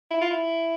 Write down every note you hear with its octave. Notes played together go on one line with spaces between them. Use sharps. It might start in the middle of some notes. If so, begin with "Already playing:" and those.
E4
F4
E4